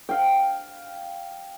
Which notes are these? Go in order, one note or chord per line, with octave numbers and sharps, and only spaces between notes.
F5 G5